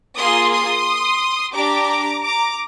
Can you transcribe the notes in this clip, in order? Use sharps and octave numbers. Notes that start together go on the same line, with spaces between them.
A#3 F4 G#4 C6 D#6
C6 D#6
D4 G4 A#5 D6
A#5 D6